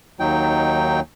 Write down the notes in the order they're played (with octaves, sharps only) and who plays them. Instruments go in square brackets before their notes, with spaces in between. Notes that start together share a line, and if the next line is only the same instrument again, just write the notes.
[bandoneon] D#2 F#3 D#4 G5